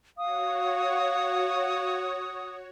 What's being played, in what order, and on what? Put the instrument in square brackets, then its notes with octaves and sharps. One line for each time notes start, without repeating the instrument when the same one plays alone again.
[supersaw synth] F#4 C#5 [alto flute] F5 [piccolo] D#6